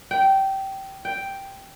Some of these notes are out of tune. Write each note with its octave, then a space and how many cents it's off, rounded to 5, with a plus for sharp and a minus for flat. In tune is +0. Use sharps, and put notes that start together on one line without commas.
G5 -15
G5 +0